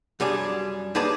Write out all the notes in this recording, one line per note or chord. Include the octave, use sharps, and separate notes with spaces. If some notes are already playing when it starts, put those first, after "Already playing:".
F#2 G3 D4 G#4
D#2 D#3 G#4 B4 D5 A5